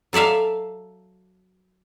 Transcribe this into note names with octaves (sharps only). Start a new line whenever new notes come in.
F#3 A4 D5 E5 F5